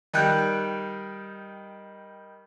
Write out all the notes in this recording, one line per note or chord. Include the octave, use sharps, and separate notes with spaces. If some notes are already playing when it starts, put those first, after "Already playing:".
D#3 G3 G5 F#6